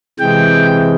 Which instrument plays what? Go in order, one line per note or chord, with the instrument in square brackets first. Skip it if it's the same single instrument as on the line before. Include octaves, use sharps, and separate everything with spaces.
[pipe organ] C3 E3 G#3 G5